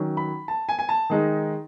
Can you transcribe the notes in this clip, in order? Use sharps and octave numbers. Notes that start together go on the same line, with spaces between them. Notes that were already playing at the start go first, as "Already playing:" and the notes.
Already playing: D#3 F#3 C#4
B5
A5
G#5
G#5
A5
D#3 G#3 D#4